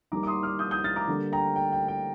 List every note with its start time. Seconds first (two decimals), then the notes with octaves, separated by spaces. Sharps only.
0.12 D#3 G3 A#3 A#5 D6
0.23 D6
0.27 C6 D#6
0.43 D6 F6
0.59 D#6 G6
0.71 D#6 G6
0.84 F6 A6
0.96 A#5 D6
1.07 D3 G3 A#3
1.32 G5 A#5
1.56 G5
1.72 G5
1.88 G5